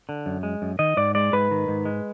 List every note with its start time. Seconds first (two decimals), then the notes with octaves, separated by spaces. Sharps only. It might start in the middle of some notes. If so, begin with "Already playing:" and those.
0.09 D3
0.26 F#2
0.43 G#3
0.62 F#2
0.79 D#3 D#5
0.97 G#2 D5
1.15 G#3 D5
1.33 G#2 B4
1.51 D#3
1.68 G#2
1.85 G#3